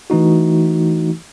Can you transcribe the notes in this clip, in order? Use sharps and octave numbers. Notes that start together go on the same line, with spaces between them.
E3 A3 D#4 F#4